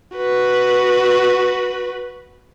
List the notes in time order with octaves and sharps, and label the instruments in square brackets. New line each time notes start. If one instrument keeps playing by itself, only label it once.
[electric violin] F#4 B4